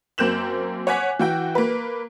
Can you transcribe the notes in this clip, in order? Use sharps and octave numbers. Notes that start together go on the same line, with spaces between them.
F#2 A#3 C4 G6 E7 F#7
C#5 F#5 G#5 D6 F#6 B6
E3 F#4 G5
A#3 B4